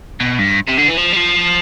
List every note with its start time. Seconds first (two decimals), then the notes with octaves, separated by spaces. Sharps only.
0.20 B2
0.39 G2
0.69 C3
0.79 D3
0.89 E3
0.98 F3
1.13 G3
1.17 F3